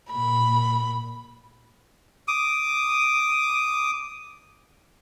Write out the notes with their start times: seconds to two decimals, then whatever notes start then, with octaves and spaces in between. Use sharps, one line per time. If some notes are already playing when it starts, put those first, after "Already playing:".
0.10 A#2 B5
2.28 D6 D#6